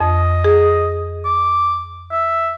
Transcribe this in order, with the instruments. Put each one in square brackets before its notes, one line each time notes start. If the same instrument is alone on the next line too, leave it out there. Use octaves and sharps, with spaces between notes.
[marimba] F2 [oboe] D#5
[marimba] G#4
[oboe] D6
E5